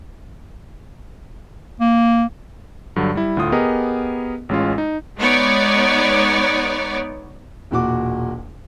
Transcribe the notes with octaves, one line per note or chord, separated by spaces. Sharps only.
A#3
G2 D3 F#3
G3 E4
D2 A2 F4 D#6
B3 G4 G#4 A#4 D#5
A1 G#3 C#4 F4
D#4
G#3 B3 D#4 C#5 D5
E1 A#2 F#4 D6